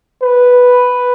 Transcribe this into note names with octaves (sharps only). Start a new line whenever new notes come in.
B4